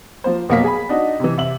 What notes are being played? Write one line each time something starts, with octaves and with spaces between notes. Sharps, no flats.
F3 A#3 C5
F1 B2 F#3 A#3 A#4 B6
G#4 G#5 B5
D4 D#4 F#4 D#5
C3 E3
C3 E5 F#7